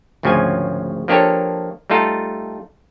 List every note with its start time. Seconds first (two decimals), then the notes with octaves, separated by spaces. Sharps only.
0.23 G#1 D2 C#3 F3 C#4 G#5
1.08 F3 A#3 D4 G4 A4 C#5
1.90 G3 A3 D#4 F4 A4